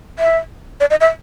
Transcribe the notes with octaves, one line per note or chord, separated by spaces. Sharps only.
E5
D5
D#5
E5